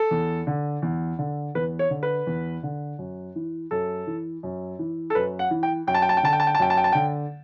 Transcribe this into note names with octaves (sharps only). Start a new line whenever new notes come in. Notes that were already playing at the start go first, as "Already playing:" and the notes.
Already playing: A4
E2
D3
E2
D3
E2 B4
C#5
D3
B4
E2
D3
F#2
E3
F#2 A4
E3
F#2
E3
A4
F#2 B4
F#5
E3
G5
F#2 G5
A5
G5
A5
G5
D3 A5
G5
A5
G5
A5
F#2 G5
A5
G5
A5
D3 G5